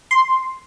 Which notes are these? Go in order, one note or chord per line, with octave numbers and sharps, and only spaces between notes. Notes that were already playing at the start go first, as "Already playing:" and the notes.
C6